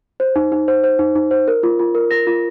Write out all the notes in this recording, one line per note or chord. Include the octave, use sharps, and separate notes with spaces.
C5
D#4
D#4
C5
C5
D#4
D#4
C5
A#4
F4
F4
A#4
A#4 A#6
F4